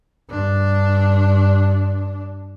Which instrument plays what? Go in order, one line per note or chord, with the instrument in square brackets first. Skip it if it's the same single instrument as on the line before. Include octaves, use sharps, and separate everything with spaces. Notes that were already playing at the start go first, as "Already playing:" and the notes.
[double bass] G2 D4